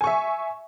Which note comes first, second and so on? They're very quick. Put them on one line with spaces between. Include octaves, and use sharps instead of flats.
G#5 C#6 E5